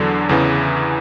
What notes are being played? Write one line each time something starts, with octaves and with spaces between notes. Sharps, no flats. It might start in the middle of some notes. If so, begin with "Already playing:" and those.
Already playing: E2 D3 F#3
E2 C#3 E3